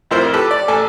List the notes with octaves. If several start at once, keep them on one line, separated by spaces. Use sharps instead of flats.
A1 F2 F3 E4 A#4 C5
G4 A4 B4
D5
A1 A4 G#5